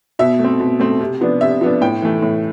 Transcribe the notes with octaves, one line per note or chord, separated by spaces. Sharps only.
B2 E5
A3
C4
B2
A3 C4
C3
F3 B3 D4
C3 E5
F3 B3 D4
A2 G5
E3 A3
A2